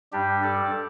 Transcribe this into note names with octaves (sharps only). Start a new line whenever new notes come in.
G2 G3 D4 G4
A4 D5